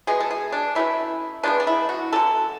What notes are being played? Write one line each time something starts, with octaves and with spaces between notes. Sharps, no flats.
B2 G#3 B3 G#4
A4
G#4
D4
B2 A3 C#4 E4
C#3 G#3 B3 D4
D4
E4
F#4
D3 F#3 C#4 A4